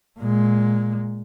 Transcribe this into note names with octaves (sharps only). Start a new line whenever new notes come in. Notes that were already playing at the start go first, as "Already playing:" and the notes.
A#2 G#3